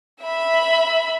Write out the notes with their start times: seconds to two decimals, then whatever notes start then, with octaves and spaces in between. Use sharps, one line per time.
0.22 E5 B5